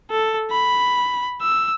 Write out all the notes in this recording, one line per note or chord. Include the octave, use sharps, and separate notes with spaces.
A4
B5
E6